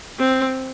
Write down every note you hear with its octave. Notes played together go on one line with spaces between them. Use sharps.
C4